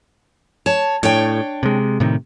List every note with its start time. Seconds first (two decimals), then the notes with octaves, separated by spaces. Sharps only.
0.66 C#5 A5
1.03 A2 D4 C#5 G5
1.63 C3 G#3
2.00 A2 C3 D#3